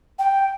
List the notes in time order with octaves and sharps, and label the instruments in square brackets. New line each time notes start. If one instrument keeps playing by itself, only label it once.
[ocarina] G5